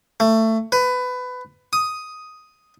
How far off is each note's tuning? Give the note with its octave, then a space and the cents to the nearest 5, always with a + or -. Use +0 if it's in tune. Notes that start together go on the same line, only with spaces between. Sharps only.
A3 +20
B4 +20
D#6 +5